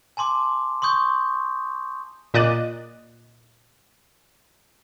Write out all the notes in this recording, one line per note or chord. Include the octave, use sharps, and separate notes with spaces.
G#5 A5 C6 D6
C6 C#6 D#6 G6
A#2 D#5 D6 F#6 A6 D#7